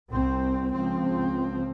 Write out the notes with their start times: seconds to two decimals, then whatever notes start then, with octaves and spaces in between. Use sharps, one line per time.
0.10 C2 C4
0.71 C#2 F3 C4